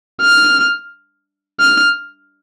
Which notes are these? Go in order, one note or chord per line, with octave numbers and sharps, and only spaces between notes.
F6
F6